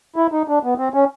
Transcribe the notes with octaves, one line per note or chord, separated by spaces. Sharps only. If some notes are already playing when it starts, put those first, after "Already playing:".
E4
D#4
D4
B3
C4
C#4